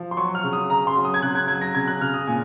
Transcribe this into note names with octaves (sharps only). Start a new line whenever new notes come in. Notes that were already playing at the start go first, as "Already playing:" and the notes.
Already playing: F3
C6
F#3 C#6
F6
C#3
D#6
C#3 A#5
C6
F#3
D#6
G#6
C#3 F#6
G#6
F#3 G#6
A#6
C#3 G#6
F#6
C#3 F6
D#6
A#2 G#5